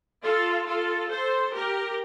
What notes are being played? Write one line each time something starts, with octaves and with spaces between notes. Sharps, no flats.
F4 A4
F4 A4
A4 C5
G4 A#4